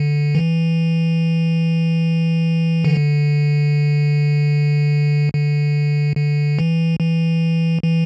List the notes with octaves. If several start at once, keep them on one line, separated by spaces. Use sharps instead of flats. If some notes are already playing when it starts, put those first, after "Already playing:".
Already playing: D3
E3
D3
D3
D3
E3
E3
E3